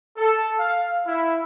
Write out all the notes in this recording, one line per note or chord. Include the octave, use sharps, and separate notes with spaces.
A4
F5
E4